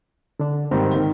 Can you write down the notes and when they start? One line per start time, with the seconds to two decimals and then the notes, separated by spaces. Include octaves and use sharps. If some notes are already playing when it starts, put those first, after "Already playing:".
0.40 D3 D4
0.71 G#2 D#3 G3 C4
0.94 D#3